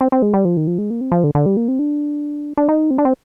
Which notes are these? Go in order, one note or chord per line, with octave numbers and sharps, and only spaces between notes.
C4
C4
G#3
G3
F3
D#3
F3
G#3
A#3
C4
F3
D3
D3
G3
A#3
C4
D4
D4
D#4
C4
D4
C4